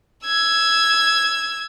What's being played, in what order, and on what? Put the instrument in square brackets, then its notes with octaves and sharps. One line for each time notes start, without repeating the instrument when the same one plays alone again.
[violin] E6 G#6